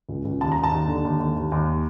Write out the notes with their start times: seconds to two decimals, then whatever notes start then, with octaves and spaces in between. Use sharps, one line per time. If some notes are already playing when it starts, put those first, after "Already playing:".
0.09 C#2
0.25 C#2
0.41 D#2 A5
0.52 D#2 A#5
0.63 A5
0.72 D#2
0.88 D3
1.05 D#2
1.20 D#2
1.36 D#2
1.52 D#2